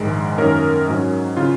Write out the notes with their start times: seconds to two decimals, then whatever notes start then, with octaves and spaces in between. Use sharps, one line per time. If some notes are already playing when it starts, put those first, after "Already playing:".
Already playing: A#1 G#2 D#3 G#3
0.38 F#2 D#3 A#3 C#4 A#4
0.87 G#2 F#3 C#4
1.37 C#3 F4